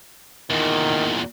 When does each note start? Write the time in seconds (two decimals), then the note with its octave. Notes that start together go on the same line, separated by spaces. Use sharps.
0.50 E2 A#2 D#3